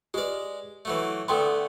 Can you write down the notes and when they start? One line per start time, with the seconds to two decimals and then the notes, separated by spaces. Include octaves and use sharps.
0.14 G#3 G4 B4 D5
0.85 E3 F#3 A3
1.28 D3 A3 B3 A4 G5 C6